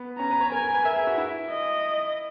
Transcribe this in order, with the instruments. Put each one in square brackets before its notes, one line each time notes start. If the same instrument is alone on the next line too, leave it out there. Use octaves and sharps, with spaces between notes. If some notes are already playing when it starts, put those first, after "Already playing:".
Already playing: [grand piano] B3
[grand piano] C#4 [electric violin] A#5
[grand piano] B4
C#5
[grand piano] A#4 [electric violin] G#5
[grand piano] A#4
B4
[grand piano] A#4 [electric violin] E5
[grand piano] G#4
F#4
E4
[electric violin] D#5